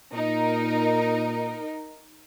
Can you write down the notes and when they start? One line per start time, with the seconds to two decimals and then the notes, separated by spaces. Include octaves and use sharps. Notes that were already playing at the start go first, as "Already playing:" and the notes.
0.13 A#2 D#4 A#4